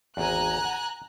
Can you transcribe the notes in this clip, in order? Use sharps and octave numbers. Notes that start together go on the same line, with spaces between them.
G#1 E2 G#5 A#5 F#6
F#5